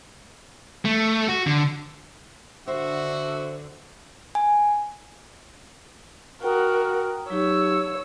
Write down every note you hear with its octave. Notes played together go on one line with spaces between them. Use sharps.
A3
F#4
D3
D3 F#4 C5 E5
G#5
F#4 A#4 G5 A#5 D#6
F#3 D#4 G4 C#5 E6